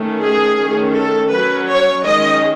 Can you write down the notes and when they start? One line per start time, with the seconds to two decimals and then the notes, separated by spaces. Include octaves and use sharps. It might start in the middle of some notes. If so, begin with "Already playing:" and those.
Already playing: D#3 A3 C#4
0.22 G#4
0.59 D#3 A3 C#4
0.95 A4
1.31 F#3 C#4 B4
1.67 C#5
2.04 D#3 G#3 C#4 D#5